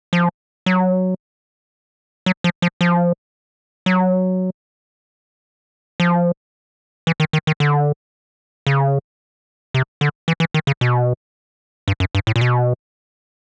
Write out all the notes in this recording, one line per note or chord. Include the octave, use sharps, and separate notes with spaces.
F3
F#3
F#3
F3
F3
F3
F#3
F3
E3
D#3
D#3
D#3
D3
C#3
C3
D3
E3
E3
D#3
C#3
B2
G2
F#2
G2
A2
A#2
B2